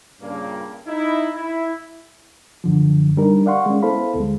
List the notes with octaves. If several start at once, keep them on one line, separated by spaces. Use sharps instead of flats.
G2 A#2 C#3 A#3
D#4 E4
E4
F#2 D3 F3
G3 D4 D#4 A#4
D5 F5 F#5 C6 C#6
G#3 C#4
B3 E4 A4 C5 F5 B5
D2 G#3